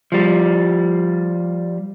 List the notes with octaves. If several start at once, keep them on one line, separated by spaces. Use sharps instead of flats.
F3 G3